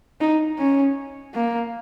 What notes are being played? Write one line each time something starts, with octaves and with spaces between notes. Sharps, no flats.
D#4
C#4
A#3